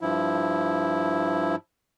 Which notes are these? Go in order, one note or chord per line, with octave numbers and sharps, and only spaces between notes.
G2 F3 E4